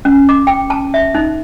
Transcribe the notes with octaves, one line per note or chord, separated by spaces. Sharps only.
C#4
D6
G5
A5
E5
D#4